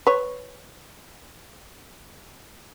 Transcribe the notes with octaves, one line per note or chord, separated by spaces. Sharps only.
B4 C#5